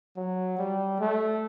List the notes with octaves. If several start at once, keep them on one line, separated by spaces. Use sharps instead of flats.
F#3
G3
A3